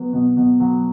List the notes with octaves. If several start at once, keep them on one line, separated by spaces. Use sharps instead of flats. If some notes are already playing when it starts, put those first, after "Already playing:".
Already playing: F#3 B3
B2
B2
F#3